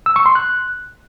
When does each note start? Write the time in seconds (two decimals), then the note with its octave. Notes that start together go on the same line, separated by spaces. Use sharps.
0.06 E6
0.16 C#6
0.26 C6
0.35 F#6